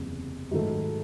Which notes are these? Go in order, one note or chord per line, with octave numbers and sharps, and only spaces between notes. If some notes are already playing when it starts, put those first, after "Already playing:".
Already playing: F#1 E2 C3
G#2 D#3 F#3 A3